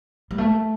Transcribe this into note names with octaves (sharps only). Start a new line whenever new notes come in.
G3
A3